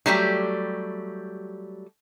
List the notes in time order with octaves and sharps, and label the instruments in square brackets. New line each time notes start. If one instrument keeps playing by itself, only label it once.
[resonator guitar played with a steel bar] F#3 G3 A3 G4